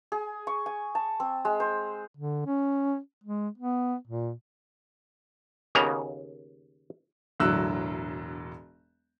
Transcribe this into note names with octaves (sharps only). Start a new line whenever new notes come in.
G#4
C#6
G#5
A5
C4
G#3
C5
D3
C#4
G#3
B3
A#2
D#2 C#3 A#3 B3 A#5
E1 A2 D3 F#3 E6 F#6